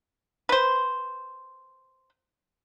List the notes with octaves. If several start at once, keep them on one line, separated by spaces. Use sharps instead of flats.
B4 C5